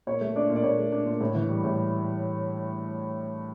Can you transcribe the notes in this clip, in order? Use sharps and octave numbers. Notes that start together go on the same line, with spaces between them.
A#2 C#5
A3
D4 D5
A#2
D5
A#2 C#5
A3
D4
A#2
A2
E3
G3
A2